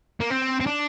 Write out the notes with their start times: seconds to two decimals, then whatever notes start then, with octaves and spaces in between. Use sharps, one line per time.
0.20 A#3
0.30 C4
0.60 C4
0.66 D4